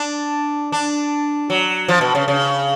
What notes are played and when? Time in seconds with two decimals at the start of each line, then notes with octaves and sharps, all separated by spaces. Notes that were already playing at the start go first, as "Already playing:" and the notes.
Already playing: D4
0.72 D4
1.50 F#3
1.89 F3
2.01 B2
2.15 C#3
2.28 C#3